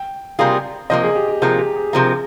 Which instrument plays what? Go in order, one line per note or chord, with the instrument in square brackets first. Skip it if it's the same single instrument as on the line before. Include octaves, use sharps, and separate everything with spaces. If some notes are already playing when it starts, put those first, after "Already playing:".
Already playing: [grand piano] G5
[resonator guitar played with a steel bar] C3 G3 A#3 F4 G#4
[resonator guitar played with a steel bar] C3 F3 A#3 [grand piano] D#5
[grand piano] G#4
G4
G4
[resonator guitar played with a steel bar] C3 F3 A#3 [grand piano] G#4
[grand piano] G4
G#4
[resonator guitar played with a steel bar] C3 F3 A#3 [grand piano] G#4